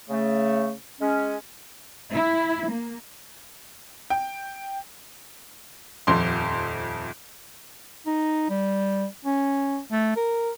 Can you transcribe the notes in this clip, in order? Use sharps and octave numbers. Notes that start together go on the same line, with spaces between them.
C#3 A3
G#3 C#4
E4
A#3
G5
D#1 F2 C6
D#4
G3
C#4
A3
A#4